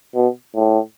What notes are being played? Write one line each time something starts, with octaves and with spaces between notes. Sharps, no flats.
B2
A2